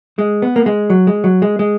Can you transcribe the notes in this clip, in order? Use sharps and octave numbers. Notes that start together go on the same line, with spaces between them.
G#3
B3
A#3
G#3
F#3
G#3
F#3
G#3
G#3